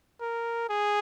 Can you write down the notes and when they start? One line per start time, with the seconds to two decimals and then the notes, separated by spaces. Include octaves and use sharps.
0.21 A#4
0.69 G#4